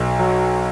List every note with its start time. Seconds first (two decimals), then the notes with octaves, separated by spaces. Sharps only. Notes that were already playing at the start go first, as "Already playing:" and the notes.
Already playing: B1
0.19 F#3